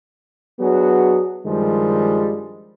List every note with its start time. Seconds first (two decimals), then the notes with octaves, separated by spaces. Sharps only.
0.60 F#3 B3 D4 F#4 G#4
1.46 G2 D#3 F3 G3 G#3